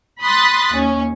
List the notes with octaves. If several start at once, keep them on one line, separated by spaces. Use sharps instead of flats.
B5 C6 D#6 F#6 A6 B6
D#2 C#4